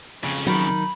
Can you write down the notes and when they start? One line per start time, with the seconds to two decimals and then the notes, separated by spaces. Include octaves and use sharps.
0.23 F2 C#3
0.47 D#3 F#3 B5